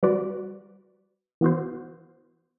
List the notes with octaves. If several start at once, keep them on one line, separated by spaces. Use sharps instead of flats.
G3 C4 F#4 B4 D5
E3 B3 F#4 C5